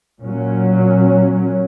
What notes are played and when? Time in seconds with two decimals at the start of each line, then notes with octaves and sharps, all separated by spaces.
0.21 A#2 F#3 C#4